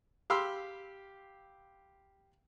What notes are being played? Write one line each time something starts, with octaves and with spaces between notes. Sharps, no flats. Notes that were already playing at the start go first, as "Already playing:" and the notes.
G4 F5 B5 C6 E6